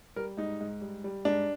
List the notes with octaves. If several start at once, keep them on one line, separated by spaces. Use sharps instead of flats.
G3 A#4
G#2 D#4
G#2
G3
G3
G#2 D4